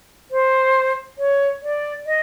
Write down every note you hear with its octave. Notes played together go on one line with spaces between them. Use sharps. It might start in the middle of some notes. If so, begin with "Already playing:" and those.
C5
C#5
D5
D#5